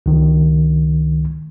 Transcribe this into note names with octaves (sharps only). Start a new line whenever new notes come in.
C#2 D#3